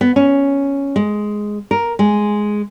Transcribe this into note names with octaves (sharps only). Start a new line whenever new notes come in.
B3
C#4
G#3
A#4
G#3